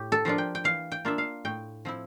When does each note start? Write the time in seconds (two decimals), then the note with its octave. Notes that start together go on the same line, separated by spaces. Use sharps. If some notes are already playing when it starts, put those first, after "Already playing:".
Already playing: A2 G4
0.12 A4
0.25 F3 A#3 D4 F4
0.38 G5
0.55 G5
0.64 E3 F5
0.92 G5
1.05 A#3 D4 F4 E5
1.18 F5
1.45 A2 G5
1.85 F3 C4 E4